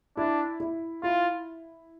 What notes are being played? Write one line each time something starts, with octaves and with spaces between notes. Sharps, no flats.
D4 E4
E4
E4 F4